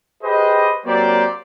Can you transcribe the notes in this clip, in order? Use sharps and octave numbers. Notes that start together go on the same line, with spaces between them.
G4 G#4 B4 C5 D#5
F#3 A#3 C4 G4 C5 D5